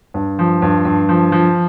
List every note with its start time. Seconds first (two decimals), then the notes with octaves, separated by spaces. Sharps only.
0.14 G2
0.39 F3
0.62 G2
0.85 G2
1.09 F3
1.32 F3